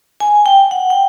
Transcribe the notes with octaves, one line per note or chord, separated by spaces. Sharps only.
G#5
G5
F#5
G5